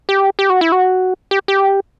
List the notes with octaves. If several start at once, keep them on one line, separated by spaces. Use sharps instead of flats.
G4
G4
F#4
E4
F#4
G4
G4